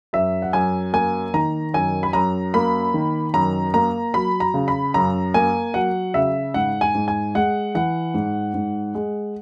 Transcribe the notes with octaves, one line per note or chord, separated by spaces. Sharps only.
F#2 E5
F#5
F#2 G#5
A#3 G#5
D#3 A#5
F#2 G#5
B5
F#2 A#5
A#3 B5
D#3
F#2 A#5
A#3 A#5
F#3 B5
A#5
C#3
B5
F#2 A#5
A#3 G#5
F#3 F#5
C#3 E5
G#2 F#5
G#5
G#2
G#5
G#3 F#5
E3 F#5
G#2
G#2
G#3